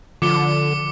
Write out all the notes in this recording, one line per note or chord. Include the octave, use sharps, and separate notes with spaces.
D3 F3 D6 C#7 G7